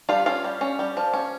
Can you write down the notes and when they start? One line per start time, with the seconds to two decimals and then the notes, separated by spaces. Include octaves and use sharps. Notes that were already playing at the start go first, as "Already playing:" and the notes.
0.09 G3 F4 F5
0.26 C#4 F4 F5
0.44 G3
0.61 C#4
0.79 G3
0.97 F3
1.14 C#4